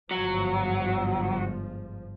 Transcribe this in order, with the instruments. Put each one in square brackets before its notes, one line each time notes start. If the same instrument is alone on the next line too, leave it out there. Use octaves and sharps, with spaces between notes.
[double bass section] G1 G#2 F3 [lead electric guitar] F#3